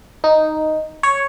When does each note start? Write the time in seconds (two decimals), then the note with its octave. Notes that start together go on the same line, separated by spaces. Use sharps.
0.24 D#4
1.03 C#5